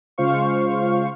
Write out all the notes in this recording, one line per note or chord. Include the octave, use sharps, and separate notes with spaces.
C#3 G#3 F4 C5 F5 C#6